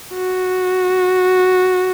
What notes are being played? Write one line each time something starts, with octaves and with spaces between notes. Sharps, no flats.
F#4